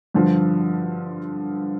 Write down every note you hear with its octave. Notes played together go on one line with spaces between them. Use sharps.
G2 D3 F3